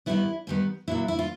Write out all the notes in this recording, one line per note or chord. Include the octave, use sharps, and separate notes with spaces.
G#2 D#3 G3 B3 E4
G#2 D#3 G3 B3
A#2 F#3 A#3 E4
E4
F4